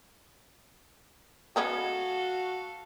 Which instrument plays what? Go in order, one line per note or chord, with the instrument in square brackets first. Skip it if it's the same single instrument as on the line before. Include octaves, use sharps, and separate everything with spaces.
[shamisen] G#3 B3 C#4 [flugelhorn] F#4 [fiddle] A4 F5